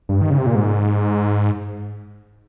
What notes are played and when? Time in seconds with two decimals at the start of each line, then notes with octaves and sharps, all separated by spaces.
0.09 G2
0.21 D#3
0.30 C#3
0.38 C3
0.46 A#2
0.55 G#2